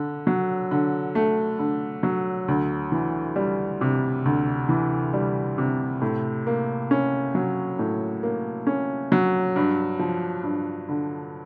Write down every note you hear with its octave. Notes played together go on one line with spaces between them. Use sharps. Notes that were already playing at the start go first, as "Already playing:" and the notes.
Already playing: D3
F#3
D3
A3
D3
F#3
D2
E3
G3
C3
D2
E3
G3
C3
A2
A#3
C#4
F#3
A2
A#3
C#4
F#3
G2
F3
G2
D3